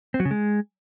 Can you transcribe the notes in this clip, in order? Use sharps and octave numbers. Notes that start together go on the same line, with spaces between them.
C4
F#3
C#3
G#3